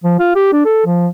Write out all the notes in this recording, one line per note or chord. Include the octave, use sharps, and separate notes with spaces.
F3
F4
G4
D4
A4
F3